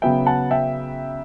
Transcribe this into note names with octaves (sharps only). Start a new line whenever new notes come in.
C#3 F#3 B3 E5 G5
F#5 A5
E5 G5